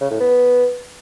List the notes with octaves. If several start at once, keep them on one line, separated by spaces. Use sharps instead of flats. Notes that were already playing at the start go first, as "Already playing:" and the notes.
C#3
A2
B3